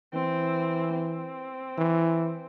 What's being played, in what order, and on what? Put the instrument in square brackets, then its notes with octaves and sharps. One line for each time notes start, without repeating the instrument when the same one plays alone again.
[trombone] E3 [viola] C4
[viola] C4
[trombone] E3